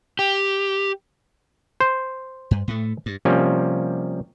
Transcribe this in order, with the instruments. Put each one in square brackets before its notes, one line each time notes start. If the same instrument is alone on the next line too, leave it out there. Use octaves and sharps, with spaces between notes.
[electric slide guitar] G4
[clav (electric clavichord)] C5
[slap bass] G2
A2 A3
G2
[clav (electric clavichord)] C3 F3 G3 A#3 C#4